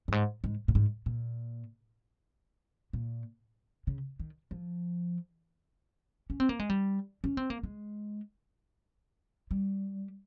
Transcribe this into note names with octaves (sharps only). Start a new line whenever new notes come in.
G2
G#2
G#2
A#2
G#2
A#2
A#2
C#3
D#3
F3
C#4
C4
A#3
G#3
G3
C#4
C4
A#3
G#3
G3